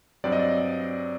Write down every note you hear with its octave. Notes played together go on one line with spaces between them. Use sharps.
G2 F#3 C4 D5
D#5
D5